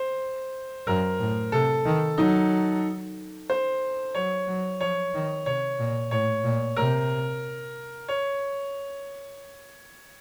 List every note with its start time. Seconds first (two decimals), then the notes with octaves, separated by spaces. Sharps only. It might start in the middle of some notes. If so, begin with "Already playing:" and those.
Already playing: C5
0.87 F#2 A#4
1.20 A2
1.52 C3 A4
1.85 D#3
2.18 F#3 D#4
3.50 C5
4.15 F#3 C#5
4.47 F#3
4.80 F3 C#5
5.14 D#3
5.46 C3 C#5
5.79 A#2
6.11 A2 C#5
6.45 A#2
6.77 C3 A#4
8.08 C#5